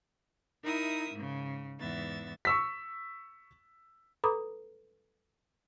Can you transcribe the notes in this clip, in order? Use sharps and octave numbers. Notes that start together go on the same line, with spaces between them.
D#4 E4 A#4 E5 D#6
G#2 C#3
E2 G#2 B3 E5 A6
C#6 E6 B6
A4 B4 A#5 B5 D6 D#6